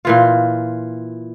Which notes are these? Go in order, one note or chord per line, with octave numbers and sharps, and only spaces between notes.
A#2 E3 F4